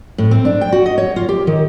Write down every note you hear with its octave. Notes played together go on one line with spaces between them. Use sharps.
A2
C4
D4
G5
F#4
D#5
C#5
F4
G4
D#3